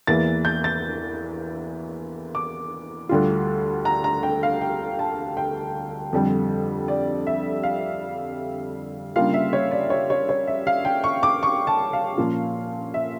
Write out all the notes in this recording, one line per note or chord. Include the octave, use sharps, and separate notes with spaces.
E2 E3 A#3 A6
G6
A6
D6
D2 D3 G3 D4 F4
A#5
A#5
G5
F5
G5
A5
G5
F2 D3 G3
D5
E5
F5
C#3 G3 A#3 D4 F4 F5
E5
C#5
D5
C#5
C#5
C#5
E5
F5
G5
C#6
D6
C#6
A5
F5
A#2 F3 A#3 C#4 F4
E5